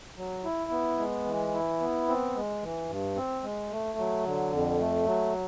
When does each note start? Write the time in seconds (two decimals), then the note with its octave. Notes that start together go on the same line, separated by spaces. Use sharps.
0.17 F#3
0.44 E4
0.71 B3
0.99 G#3
1.25 E3
1.53 E4
1.80 B3
2.08 C4
2.35 G#3
2.62 E3
2.89 G2
3.17 C4
3.43 G#3
3.71 A3
3.98 F#3
4.25 D3
4.52 F2
4.80 A3
5.07 F#3